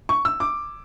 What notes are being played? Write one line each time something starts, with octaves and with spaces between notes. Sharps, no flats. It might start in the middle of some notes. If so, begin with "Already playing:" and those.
C#6
E6
D6